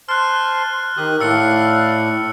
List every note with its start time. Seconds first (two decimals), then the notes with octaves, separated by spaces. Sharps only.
0.09 C5 A5 C6 F6 F#6
0.97 D#3 G4 D#6 F#6
1.20 A2 D5 F5 E6 F#6 C#7